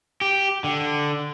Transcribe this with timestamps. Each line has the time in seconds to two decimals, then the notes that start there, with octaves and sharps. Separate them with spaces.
0.21 G4
0.64 D3